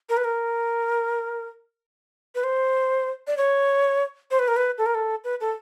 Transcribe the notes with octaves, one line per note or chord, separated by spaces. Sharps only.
A#4
B4
A#4
B4
C5
D5
C#5
C5
B4
A#4
B4
A4
A#4
A4
B4
A4